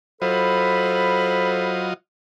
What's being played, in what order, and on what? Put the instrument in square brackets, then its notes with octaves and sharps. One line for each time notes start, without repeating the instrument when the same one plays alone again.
[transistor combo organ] F#3 F4 D#5 [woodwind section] A4 C5 B5